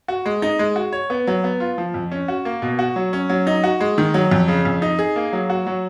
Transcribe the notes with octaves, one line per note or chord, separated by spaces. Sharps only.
F#4
G#3
D#4
G#3
F#4
C#5
B3
F#3
B3
F4
F3
F2
C#4
F#4
A#3
B2
F#4
F#3
C#4
F#3
D#4
F#4
G#3
D#3
F#3
F2
C#3
F2
D#4
G#4
A#3
F#3
F#4
F#3